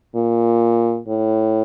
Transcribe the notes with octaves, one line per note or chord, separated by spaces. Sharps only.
A#2
A2